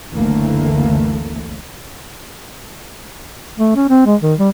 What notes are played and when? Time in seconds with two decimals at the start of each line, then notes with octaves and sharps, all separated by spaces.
0.12 F#1 D2 D3 E3 A3 A#3
3.57 A3
3.75 C#4
3.89 C4
4.06 G#3
4.22 D#3
4.39 G3